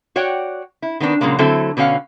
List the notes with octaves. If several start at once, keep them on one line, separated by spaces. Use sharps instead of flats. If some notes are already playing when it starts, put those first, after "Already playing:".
F#4 C#5 D5 F#5 G5
E4
D#3 B3 C4 D4
A#2 C#3 F#3 G#3 A#3
D3 F#3 A3 C4 E4 A4
B2 D3 C#4 F#4 F5 F#5